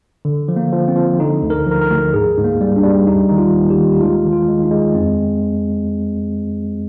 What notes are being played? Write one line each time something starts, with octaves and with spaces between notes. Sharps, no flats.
D3
F3
A#3
F3
C4
F3
D3 D#4
D2
A#4
F3
A#4
A#4
D2
G#2 G#4
G#2
A#3
G3
D4
G3
D#2 D#4
D#3 D#4
F4
D#2
G4
D#2
D#4
G#3 F4
D#3
F4
G#3
D#4
G#3
F2 C4